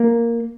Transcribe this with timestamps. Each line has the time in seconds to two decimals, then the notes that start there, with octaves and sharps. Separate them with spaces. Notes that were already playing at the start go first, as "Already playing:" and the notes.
Already playing: A#3